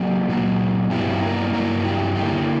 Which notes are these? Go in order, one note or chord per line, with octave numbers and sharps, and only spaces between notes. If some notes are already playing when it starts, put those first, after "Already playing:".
Already playing: F#3 A#3 G4
A#2 F#3 A#3
G2 F#3 B3 E4 G4
A#3 A#4
G2 F#3 A#3 E4 A#4
G4
D3 A#3 E4 G4